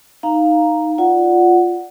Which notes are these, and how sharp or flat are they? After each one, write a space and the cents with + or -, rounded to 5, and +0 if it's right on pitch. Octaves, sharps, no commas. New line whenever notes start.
D#4 +0 F5 +0 A#5 +0
F4 +0 D5 +0 F#5 +0